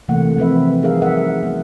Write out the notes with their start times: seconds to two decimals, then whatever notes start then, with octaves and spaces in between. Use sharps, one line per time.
0.08 C3 E3 A3 A#3 F#5
0.37 F3 C4 B4 E5
0.82 G3 D#4 G#4 A#4 E5 F5
1.02 G3 E5 F#5
1.43 A3 B3